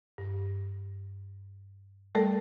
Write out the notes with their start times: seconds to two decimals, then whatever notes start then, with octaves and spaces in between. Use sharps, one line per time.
0.18 G2
2.15 G3 A3 A4 A#4 D5